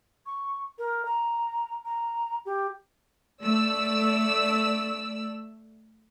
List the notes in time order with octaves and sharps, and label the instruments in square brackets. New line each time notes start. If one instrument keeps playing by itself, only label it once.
[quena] C#6
A#4
A#5
A#5
G4
[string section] A3 D5 E6